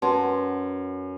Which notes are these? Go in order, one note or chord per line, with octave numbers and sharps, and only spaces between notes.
F#2 B4 A5 C6